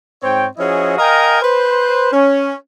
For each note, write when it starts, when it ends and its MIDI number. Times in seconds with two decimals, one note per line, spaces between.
0.23 0.44 44
0.23 0.44 60
0.23 0.44 73
0.23 0.44 79
0.57 0.96 53
0.57 0.96 61
0.57 0.96 64
0.57 0.96 66
0.57 0.96 68
0.57 0.96 75
0.97 1.40 70
0.97 1.40 75
0.97 1.40 77
0.97 1.40 79
0.97 1.40 80
0.97 1.40 82
1.41 2.10 71
1.41 2.10 72
2.11 2.53 61